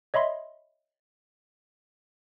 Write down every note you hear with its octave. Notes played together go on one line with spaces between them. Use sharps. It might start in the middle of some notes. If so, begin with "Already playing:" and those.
C#5 D#5 E5 B5 C6